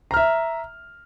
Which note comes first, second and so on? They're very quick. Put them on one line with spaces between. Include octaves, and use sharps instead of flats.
A#5 F6 E5